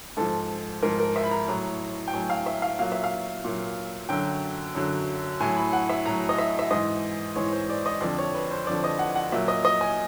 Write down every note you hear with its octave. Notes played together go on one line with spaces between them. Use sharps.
G#2 F3 A4
G#2 F3 A#4
A#4
E5
B5
A#5
A2 F#3 A#5
G5
A2 F#3 G#5
F5
E5
F5
A#2 F#3 F5
E5
F5
A#2 F#3
F#2 D3 F#3 G5
F#2 D3 F#3
A2 F#3 G#5
B5
F#5
E5
A2 F#3 A#5
D#5
E5
E5
G#2 E3 D#5
G#2 E3 C#5
C5
D5
D#5
F2 D3 F3 D5
C#5
B4
C5
F2 D3 F3 D5
D#5
F#5
F#5
A#2 F#3 E5
D#5
D#5
G#5